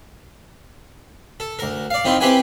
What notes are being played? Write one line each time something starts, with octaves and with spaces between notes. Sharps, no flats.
A4
D2 A#4
D5 F5
D#3 C4 E4 F4
C4 E4 G4 B4 G5 G#5